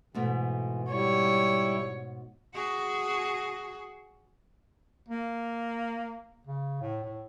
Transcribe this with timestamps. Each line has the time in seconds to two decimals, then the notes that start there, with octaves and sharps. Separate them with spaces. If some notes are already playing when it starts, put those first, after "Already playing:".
0.15 G#2 B2 E3 A3
0.91 G3 E4 C#5
2.54 F#4 G#4
5.08 A#3
6.47 C#3
6.81 A2
7.04 A2